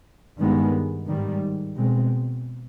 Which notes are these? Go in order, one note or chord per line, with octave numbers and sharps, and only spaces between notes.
G2 D#3 G#3 B3
G#2 D#3 G3
B2 G#3 C4